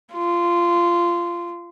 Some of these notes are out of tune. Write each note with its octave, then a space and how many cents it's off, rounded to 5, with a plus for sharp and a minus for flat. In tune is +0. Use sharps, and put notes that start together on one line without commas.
F4 -15